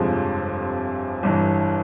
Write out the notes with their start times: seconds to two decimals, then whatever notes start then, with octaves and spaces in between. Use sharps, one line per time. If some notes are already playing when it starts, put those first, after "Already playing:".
Already playing: G1 F2 C3 F3 G#3
1.23 G1 G2 E3